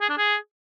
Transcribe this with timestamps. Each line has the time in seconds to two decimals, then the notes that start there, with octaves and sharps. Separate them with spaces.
0.01 G#4
0.10 D4
0.18 G#4